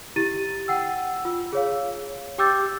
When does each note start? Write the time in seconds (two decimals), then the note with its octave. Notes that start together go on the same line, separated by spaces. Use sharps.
0.16 E4 G4 A6 D#7
0.68 F#5 G5 E6
1.25 F4 E6
1.53 G#4 C#5 F5
2.38 G4 G5 D6 E6 G6 A6